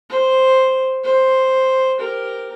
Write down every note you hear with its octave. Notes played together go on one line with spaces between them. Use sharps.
C5
C5
G4 A#4